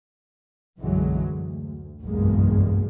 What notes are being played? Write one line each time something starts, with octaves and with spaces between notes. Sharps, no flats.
B1 F#2 D3 E3 F#3 G#3
D2
F#1 B1 E2 G2 G#3 A#3